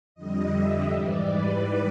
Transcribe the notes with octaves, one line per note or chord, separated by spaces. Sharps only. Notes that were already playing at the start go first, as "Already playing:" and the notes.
F2 D3 G3 D#5
E5
G#2 E3 G3 D5
B4